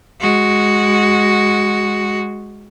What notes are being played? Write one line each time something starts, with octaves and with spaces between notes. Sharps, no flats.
G#3 F#4